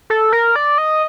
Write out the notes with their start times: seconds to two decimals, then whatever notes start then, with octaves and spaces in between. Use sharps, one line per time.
0.10 A4
0.32 A#4
0.56 D5
0.78 D#5